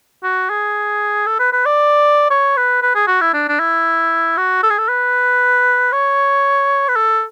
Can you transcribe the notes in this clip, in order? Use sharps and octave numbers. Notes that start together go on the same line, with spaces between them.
F#4
G#4
A4
B4
B4
D5
C#5
B4
B4
G#4
F#4
E4
D4
D4
E4
F#4
A4
G#4
A4
B4
C#5
B4
A4